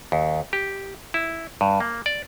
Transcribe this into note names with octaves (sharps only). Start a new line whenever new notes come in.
D#2
G4
E4
G2
A#3
D5